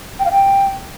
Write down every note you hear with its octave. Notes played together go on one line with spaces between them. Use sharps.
G5
F5
G5